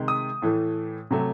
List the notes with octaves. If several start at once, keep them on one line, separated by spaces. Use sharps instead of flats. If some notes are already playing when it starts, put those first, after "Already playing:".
Already playing: C3 D#3 G#3
D#6
A2 E3 A3
C3 F#3 A3